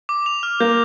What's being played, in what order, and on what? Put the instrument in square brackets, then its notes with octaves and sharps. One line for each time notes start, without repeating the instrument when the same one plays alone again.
[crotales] D6
F7
F6
[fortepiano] A#3 [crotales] G6